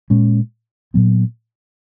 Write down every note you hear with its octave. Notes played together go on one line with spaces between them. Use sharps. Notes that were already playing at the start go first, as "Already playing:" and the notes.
A#2 G#3 C#4
A#2 F#3 B3